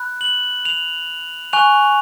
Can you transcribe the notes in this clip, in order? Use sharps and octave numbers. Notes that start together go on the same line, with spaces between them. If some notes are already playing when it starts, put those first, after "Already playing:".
Already playing: B5 F#6
F#7
F7
G#5 C#6 F#6 F7